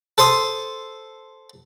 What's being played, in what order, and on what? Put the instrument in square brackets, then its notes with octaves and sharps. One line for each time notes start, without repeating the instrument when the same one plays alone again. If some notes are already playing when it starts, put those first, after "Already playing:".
[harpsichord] A4 C5 C6 D#6